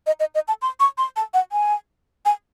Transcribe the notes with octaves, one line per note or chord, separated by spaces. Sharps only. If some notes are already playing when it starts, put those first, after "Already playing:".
D#5
D#5
D#5
A5
C6
C#6
C6
A5
F#5
G#5
G#5